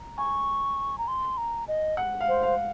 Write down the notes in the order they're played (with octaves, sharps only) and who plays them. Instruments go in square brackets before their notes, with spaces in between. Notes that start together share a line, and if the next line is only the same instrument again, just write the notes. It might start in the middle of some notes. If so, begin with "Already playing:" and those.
Already playing: [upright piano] A#5
[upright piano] G#5 [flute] C#6
[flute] A#5
C6
A#5
D#5
[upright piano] F#5
F5
[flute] C5
[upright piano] F5